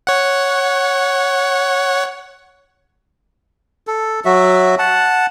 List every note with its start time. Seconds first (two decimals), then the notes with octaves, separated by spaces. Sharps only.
0.07 C#5 F#5
3.87 A4
4.25 F#3 F#4 E5
4.79 F#5 A5